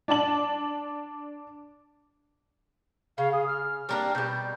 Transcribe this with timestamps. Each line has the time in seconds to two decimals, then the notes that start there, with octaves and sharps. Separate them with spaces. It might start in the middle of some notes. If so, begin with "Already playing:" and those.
0.08 D4 D5 A5 F#7
3.18 C#3 F5
3.32 G#4
3.47 F6
3.89 G3 A#3 D4
4.15 B2 G3 G6